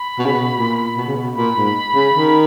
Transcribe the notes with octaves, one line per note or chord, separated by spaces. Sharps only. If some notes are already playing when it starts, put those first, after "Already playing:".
Already playing: B5
B2
C#3
B2
A#2
B2
C#3
B2
A#2 B5
G#2
C#3
D#3